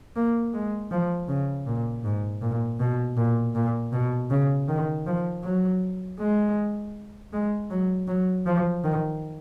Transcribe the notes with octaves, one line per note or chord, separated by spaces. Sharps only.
A#3
G#3
F3
C#3
A#2
G#2
A#2
B2
A#2
A#2
B2
C#3
D#3
F3
F#3
G#3
G#3
F#3
F#3
F3
D#3